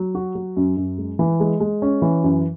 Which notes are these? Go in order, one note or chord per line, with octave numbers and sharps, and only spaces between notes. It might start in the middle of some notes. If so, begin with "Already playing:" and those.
Already playing: F#3
F#4
F#3
F#2
F#2
G#3
E3
G#3
G#3
C#4
E3
F#2